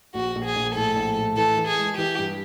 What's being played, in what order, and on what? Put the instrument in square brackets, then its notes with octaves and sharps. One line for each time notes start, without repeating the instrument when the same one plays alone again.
[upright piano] A#1 [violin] F#4
[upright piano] A#1
[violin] G#4
[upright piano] A#1
[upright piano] A2 [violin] A4
[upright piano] A#1
A2
[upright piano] E3 [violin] A4
[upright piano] E3
[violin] G#4
[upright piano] G#3
[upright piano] E3 [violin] G4
[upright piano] G2